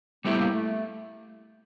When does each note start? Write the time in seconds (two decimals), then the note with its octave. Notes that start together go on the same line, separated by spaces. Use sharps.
0.25 G3 A3 B3 E4 G4
0.38 A#3
0.52 A3